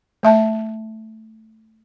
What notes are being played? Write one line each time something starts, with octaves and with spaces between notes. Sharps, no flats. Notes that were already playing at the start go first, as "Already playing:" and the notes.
A3 E5 A5